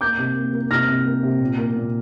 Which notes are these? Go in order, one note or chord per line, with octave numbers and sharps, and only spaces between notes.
A#3 D6 G6
C3
A#3
A#3
C3 F6 A#6
C3
A#3
C3
A#2
A#3
A#2